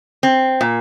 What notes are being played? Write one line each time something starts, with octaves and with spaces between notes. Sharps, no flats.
C4
A#2